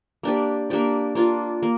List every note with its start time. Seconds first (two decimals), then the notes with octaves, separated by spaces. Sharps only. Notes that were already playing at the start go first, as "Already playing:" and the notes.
0.23 A#3 D4 G4 D5
0.70 A#3 D4 G4 D5
1.15 A#3 D4 F4
1.63 A#3